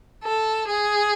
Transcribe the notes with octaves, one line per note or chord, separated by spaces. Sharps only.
A4
G#4